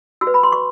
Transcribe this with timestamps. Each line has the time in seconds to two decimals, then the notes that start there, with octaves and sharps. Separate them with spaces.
0.21 F#4 E6
0.27 B4
0.34 B5
0.43 C6
0.52 C#6